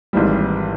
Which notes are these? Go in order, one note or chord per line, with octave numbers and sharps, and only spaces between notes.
G#1 G#2 E3 G3